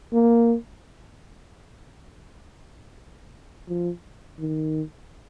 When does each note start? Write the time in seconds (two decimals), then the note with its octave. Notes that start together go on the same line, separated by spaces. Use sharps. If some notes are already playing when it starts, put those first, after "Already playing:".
0.13 A#3
3.68 F3
4.39 D#3